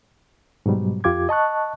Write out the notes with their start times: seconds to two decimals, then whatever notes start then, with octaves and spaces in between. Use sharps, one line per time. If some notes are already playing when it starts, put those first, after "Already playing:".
0.66 G#2 B2 F#3 G3
1.04 F2 F4 G4 D6 G#6
1.29 D#5 A5 C#6 F#6